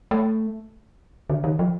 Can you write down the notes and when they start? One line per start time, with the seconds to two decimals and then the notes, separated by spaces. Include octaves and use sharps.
0.11 A3
1.30 D3
1.44 D#3
1.59 F3